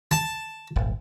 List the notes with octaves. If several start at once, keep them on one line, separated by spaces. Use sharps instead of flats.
A5
D#1 G#1